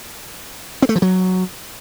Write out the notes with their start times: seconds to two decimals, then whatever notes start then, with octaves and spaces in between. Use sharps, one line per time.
0.82 C4
0.89 A3
0.96 F3
1.02 F#3